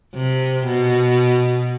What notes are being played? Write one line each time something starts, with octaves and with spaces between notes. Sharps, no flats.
C3
B2